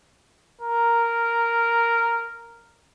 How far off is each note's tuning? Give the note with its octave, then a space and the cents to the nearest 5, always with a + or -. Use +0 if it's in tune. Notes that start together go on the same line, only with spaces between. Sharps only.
A#4 -5